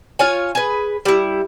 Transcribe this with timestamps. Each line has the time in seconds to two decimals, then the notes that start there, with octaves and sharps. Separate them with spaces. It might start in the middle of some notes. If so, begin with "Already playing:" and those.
0.19 F4 C#5 G#5
0.55 G#4 B4
1.05 G3 E4